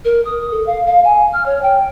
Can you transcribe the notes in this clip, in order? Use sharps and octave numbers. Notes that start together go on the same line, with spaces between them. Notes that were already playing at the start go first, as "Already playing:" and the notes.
A#4
D#6
A4
F5
F5
G#5
F6
C#5
G5